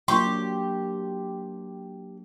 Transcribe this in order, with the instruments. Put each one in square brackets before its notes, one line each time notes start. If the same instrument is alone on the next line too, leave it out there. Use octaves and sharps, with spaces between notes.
[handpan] F#3 A#3 D4 [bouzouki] G4 [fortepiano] C6 C#6